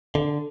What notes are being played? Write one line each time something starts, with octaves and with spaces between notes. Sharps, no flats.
D3